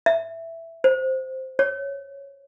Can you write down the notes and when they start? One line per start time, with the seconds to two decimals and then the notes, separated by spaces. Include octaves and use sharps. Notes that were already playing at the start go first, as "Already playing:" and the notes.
0.06 E5
0.84 C5
1.59 C#5